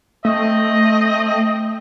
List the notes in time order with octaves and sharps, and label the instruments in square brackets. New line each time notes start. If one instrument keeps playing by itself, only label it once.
[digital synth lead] A3 [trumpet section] C4 D#5